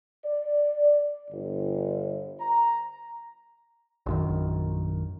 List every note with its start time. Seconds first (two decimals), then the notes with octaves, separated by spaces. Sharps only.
0.24 D5
1.31 G1
2.40 A#5
4.06 A#1 F#2 D#3